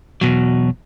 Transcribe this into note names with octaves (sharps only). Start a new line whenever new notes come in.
E2 B2 F#3